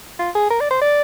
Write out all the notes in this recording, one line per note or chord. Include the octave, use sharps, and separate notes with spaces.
F4
G#4
A#4
D5
C5
D5